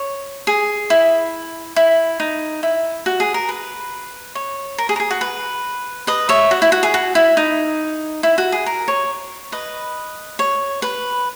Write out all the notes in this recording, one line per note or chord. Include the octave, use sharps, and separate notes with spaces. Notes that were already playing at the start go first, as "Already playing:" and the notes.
Already playing: C#5
G#4
E4
E4
D#4
E4
F#4
G#4
A#4
B4
C#5
A#4
G#4
A#4
G#4
F#4
B4
B4 D#5
C#5 E5
F#4
E4
F#4
G#4
F#4
E4
D#4
E4
F#4
G#4
A#4
C#5
B4 D#5
C#5
B4